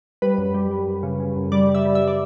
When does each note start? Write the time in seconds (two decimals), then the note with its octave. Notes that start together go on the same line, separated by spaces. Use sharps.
0.22 G3 B4
0.38 F#2
0.54 G3
0.71 G3
0.88 F#2
1.03 C#3
1.20 C#3
1.36 F#2
1.52 G3 D5
1.69 G3
1.75 E5
1.85 G3
1.95 E5
2.08 D5